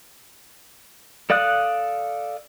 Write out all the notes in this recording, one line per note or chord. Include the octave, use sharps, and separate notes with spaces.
A4 D5 F5 D#6 F#6